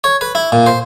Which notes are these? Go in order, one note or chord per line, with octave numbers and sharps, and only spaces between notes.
C#5
B4
E4
A#2
C5